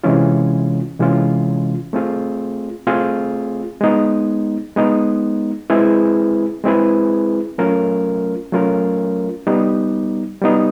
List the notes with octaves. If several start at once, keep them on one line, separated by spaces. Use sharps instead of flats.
C3 E3 G#3 C#4 F4
C3 E3 G#3 C#4 F4
A3 C4 F4 G#4
A3 C4 F4 G#4
G#3 B3 D#4
G#3 B3 D#4
G#3 C4 E4 G#4 B4
G#3 C4 E4 G#4 B4
F#3 A3 C#4 F4 A#4
F#3 A3 C#4 F4 A#4
G3 B3 D#4
G3 B3 D#4